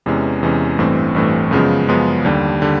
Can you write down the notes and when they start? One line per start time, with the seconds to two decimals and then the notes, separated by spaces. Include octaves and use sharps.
0.06 E2 C3 E3 G#3 C#4
0.43 E2 C3 E3 G#3 C#4
0.79 A1 G2 E3 A3 C4
1.14 A1 G2 E3 A3 C4
1.51 F#2 C#3 F3 G#3 B3
1.88 F#2 C#3 F3 G#3 B3
2.25 D#2 D3 G3
2.62 D3 G3